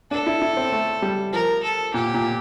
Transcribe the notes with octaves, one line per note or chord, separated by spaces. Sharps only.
D4 A4
E4
E4
C4
A3
G3
F3 A#4
A4
A#2 G4
A#2